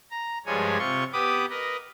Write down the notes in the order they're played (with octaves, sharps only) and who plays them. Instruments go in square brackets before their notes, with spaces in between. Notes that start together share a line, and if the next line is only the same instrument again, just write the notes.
[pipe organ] A#5
G2 F3 G3 G#3 C#5 G#5
C3 F4 C6 C#6
B3 G4 B5 D6 D#6
A#4 B4 D#5